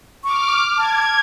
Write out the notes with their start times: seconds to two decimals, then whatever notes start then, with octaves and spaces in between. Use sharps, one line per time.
0.24 C#6 D6 F6
0.78 A5 G#6